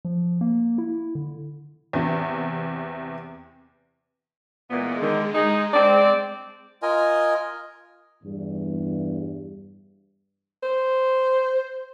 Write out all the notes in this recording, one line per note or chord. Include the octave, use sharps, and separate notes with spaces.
F3
A#3
E4
D3
E2 C3
A#2 E3 G#3 B3
D3 D#3
D#4 G#4
C4 D5
F4 A#4 D#5 G#5
E2 G2
C5